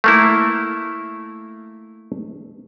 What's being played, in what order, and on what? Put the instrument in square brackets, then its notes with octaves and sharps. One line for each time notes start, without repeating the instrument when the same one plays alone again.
[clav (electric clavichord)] A3 A#3 E4